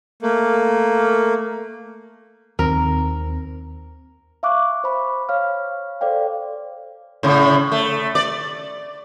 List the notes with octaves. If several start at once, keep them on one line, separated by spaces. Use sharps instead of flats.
A3 A#3
D#2 C4 A#4
E5 F5 C#6 D6 F#6
C5 B5
C#5 F5 F6
A4 C5 D5 F5 G5
A2 C#3
A3
D5